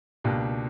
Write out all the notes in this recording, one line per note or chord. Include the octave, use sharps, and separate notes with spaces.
C#2 B2 A#3 D4 G4